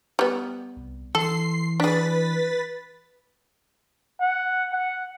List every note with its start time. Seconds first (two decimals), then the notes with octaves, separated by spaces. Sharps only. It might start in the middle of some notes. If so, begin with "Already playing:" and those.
0.19 G3 B3
0.76 C2
1.15 E3 A4 C6 C7
1.80 D4 G#4 B4 A6 B6
4.21 F#5
4.73 F#5